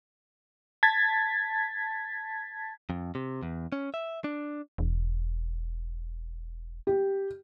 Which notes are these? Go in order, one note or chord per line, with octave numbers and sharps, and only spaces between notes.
A5 G#6 A6 B6
F2
C3
E2
C#4
E5
D4
E1
G4